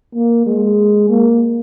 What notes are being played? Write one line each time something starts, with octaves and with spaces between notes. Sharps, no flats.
A#3
G#3
A#3